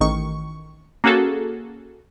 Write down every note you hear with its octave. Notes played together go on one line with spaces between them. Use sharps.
A1 D#3 C#6
A#3 C#4 F#4 G#4 A4